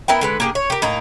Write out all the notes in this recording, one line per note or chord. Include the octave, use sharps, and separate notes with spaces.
B3 E4 A#4 G5
D3 G#3 B4
A#3 G4 G#4
C#5
G4 A#4
A2 A#3 D#4 A#5